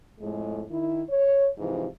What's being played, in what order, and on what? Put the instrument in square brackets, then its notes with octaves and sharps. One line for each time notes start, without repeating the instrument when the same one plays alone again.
[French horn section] F2 A2 G#3
D#3 E4
C#5
G#2 C3 E3 F3